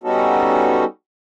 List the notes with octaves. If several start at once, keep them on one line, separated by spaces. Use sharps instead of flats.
G3 B3 C#4 D#4 F#4 A4